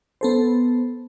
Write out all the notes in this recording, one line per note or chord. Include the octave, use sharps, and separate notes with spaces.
B3 A4 C5